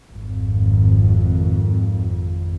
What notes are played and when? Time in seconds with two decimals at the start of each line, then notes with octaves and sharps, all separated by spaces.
0.13 G#1 F2